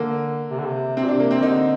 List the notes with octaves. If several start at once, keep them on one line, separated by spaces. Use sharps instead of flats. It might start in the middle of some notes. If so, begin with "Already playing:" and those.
Already playing: D3 A#3
C3
D3
C3
C3 C4
A#2
D4
C3
A#3
C4
D3 D#4